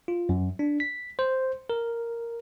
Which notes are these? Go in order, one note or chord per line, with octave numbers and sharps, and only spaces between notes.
F4
F#2
D4
B6
C5
A#4